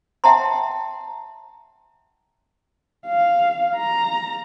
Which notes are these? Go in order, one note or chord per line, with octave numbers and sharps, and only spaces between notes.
E5 F#5 G5 A5 A#5 C6
F5
A#5